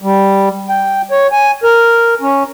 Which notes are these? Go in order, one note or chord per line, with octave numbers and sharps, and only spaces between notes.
G3
G5
C#5
G#5
A#4
C#4